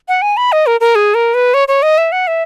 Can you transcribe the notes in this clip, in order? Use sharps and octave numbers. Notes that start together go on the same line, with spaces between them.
F#5
G#5
B5
D#5
A#4
A#4
G#4
A#4
B4
C#5
C#5
D#5
E5
F#5
E5